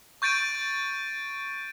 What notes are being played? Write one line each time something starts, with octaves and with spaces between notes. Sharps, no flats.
C#6 G6 A6 D7 D#7